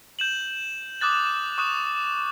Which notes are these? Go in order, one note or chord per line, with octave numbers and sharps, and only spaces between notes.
G6 E7 F#7
D6 D#6 F#6 A6 F#7
C#6 D#6 F#6 E7